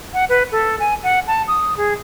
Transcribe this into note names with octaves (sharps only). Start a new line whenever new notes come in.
F#5
B4
A4
G#5
F#5
A5
D#6
G#4